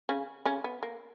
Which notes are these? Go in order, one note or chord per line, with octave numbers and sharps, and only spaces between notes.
C#3 C#4
C#3 C#4
B3
A#3